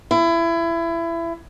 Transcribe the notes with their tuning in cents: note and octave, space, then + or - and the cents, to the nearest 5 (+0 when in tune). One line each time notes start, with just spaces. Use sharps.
E4 +25